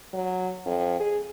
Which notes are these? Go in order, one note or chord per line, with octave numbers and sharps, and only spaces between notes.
F#3
F2
G#4